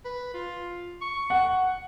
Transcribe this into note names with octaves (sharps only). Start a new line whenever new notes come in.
B4
F4
C#6
F#5